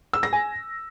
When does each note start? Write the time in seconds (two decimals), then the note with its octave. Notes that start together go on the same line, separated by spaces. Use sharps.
0.13 E6
0.23 A#6
0.33 G#5